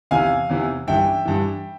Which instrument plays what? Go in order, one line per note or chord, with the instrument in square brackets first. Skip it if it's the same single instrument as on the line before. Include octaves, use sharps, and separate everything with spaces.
[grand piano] E2 C3 E3 F5 G#5
E2 C3 E3
G2 E3 E5 G5
G2 E3